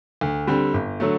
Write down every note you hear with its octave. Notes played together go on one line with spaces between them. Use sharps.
D2
D3 G3 C4
G1
D3 F#3 A3